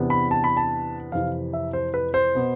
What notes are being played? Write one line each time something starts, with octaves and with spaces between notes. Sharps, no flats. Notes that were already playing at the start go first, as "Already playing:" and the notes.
Already playing: E2 C3 E3 B3 D4
B5
A5
B5
A5
F2 C3 E3 F5
E5
C5
B4
C5
B2 B3